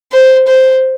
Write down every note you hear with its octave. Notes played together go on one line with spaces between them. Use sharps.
C5
C5